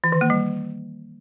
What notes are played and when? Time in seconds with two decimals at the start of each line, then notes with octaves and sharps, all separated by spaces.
0.04 E3
0.12 D#3
0.21 A#3
0.30 G3